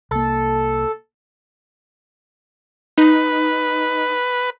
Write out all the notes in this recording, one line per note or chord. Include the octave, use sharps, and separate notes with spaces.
C2 A#3 A4
D#4 B4